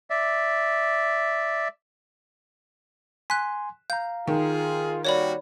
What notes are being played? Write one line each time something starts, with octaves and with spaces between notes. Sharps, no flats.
D5 E5
G#5 C6 F#6 B6
F5 A#5 G6
D#3 F4 G#4
G3 A#3 F#4 C#5 D5 B5